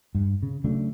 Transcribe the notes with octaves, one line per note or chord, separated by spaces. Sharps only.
G2
C#3
C#3 F#3 A3 D4